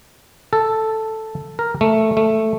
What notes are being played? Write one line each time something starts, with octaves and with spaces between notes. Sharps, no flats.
A4
A#4
A3
A3